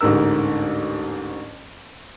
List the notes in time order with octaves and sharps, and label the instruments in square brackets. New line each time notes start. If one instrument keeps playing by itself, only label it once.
[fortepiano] A1 D2 G#2 A#4 E6